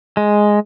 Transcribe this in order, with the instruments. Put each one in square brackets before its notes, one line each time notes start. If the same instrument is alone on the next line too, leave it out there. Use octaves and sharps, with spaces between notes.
[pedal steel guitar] G#3